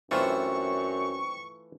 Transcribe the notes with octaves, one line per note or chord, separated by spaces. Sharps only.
F#2 E3 A3 C4 D4 F4 C#6